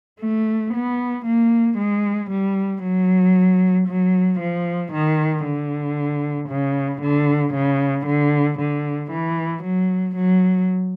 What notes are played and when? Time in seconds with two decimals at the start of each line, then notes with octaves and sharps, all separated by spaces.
0.21 A3
0.74 B3
1.26 A#3
1.78 G#3
2.30 G3
2.83 F#3
3.88 F#3
4.40 F3
4.93 D#3
5.44 D3
6.49 C#3
7.02 D3
7.54 C#3
8.06 D3
8.59 D3
9.11 E3
9.63 F#3
10.16 F#3